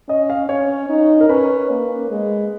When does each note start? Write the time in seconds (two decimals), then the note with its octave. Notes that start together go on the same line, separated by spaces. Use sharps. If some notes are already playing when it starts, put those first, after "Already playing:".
0.08 C#4 D#5
0.30 F5
0.49 C#4 C#5
0.89 D#4
1.21 A#4
1.29 C#4 B4
1.70 A#3
2.11 G#3